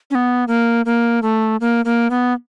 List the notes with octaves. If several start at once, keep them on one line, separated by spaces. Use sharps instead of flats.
C#4
B3
A#3
A#3
A3
A#3
A#3
B3